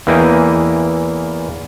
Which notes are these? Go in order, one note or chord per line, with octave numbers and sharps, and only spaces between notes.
E2 E3 A#3 D#5 G5